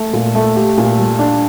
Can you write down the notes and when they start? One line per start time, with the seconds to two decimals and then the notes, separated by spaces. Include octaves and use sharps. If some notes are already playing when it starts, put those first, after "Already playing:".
Already playing: A3
0.13 A#2
0.35 A3
0.56 G4
0.78 A#2
0.99 G3
1.19 D4